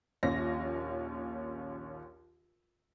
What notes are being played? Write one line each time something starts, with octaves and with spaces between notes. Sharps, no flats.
A#1 D#2 C#4 A#6